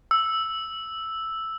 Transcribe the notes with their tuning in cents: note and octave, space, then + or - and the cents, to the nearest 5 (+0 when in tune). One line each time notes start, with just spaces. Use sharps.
E6 +0